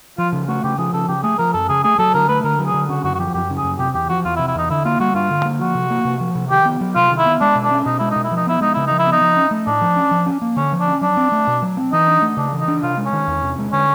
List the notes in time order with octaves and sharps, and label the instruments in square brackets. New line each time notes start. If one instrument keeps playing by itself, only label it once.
[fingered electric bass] F3 [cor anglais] F4
[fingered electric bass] C#3
[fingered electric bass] A3 [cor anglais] F#4
[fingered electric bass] C#3 [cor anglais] G4
[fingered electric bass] F3 [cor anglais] G#4
[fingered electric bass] C#3 [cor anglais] A4
[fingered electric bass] C#3 [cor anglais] G4
[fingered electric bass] A3 [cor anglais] G#4
[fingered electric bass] F3 [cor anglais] A#4
[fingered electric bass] F#2 [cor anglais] A4
[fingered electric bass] C#3 [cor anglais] G#4
[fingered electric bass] A3 [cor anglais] G#4
[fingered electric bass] F#3 [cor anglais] A4
[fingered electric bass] D3 [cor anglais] A#4
[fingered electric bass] A3 [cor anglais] B4
[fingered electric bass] D3 [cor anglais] A#4
[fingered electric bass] F#3
[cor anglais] G#4
[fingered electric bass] D3
[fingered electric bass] C#3 [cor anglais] F#4
[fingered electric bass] F#2 [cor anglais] F#4
[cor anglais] F#4
[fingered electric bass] F3 [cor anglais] G4
[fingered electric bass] F#2 [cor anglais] G4
[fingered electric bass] C#3
[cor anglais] G#4
[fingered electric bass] F#2
[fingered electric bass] C3 [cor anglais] G4
[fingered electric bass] E2 [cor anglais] G4
[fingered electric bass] F3 [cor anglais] F#4
[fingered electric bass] E2 [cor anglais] F4
[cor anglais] E4
[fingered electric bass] C3
[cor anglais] E4
[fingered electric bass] E2 [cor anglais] D#4
[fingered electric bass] D3 [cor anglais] E4
[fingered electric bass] A#3 [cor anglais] F4
[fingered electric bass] G3 [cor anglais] F#4
[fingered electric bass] G2 [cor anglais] F4
[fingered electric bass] D3
A#3
[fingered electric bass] F3 [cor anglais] F#4
[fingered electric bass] C3
A#3
C3
F3
C3
[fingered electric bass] D#3 [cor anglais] G4
[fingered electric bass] B3
F#3
[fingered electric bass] C3 [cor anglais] F4
[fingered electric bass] D#3
[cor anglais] E4
[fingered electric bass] B3
[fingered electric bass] G#3 [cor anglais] D4
[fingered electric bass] B2
[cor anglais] D4
[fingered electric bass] C#4
[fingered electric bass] B2 [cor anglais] D#4
[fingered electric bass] G#3 [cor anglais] E4
[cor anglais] D#4
[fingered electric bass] B2
[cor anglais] E4
[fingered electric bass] F3
[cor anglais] D#4
[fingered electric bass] B3 [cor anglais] E4
[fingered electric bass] G#3 [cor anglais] D#4
[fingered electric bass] C#3 [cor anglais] E4
[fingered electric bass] F3 [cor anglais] D#4
[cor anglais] E4
[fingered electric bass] B3
[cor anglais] D#4
[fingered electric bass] F3
C#4
A3
[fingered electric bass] A2 [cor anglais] D4
[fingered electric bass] F3
C#4
F3
C#4
A#3
[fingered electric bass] D3 [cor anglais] C#4
[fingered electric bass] F3
[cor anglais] D4
[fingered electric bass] C#4
[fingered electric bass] F#3 [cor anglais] D4
[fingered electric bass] C4
A3
B2
F#3
C4
[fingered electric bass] E3 [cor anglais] D#4
[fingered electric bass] D4
A3
[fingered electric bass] C#3 [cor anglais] D4
[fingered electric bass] E3
[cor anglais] D#4
[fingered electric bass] D4
[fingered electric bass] C3 [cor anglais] F4
[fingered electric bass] G#3
[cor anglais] C#4
[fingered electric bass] D#3
E2
C3
G#3
[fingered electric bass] D3 [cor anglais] C#4